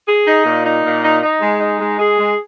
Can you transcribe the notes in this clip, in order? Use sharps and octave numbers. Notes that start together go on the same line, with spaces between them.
G#4
D#4
A#2
D#4
A#2
D#4
D#4
G#3
D#4
G#3
G#4
G#3